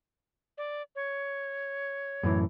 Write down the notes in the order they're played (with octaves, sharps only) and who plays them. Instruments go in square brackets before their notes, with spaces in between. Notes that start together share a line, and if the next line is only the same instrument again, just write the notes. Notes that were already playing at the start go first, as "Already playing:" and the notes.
[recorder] D5
C#5
[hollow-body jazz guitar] F#2 A2 E3